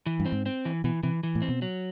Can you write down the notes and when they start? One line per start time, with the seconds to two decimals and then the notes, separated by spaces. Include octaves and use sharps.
0.06 E3
0.20 G2
0.26 C4
0.32 G#2
0.46 C4
0.65 E3
0.84 B2 E3
1.03 C3 E3
1.23 E3
1.35 A2
1.42 C4
1.49 B2
1.62 F#3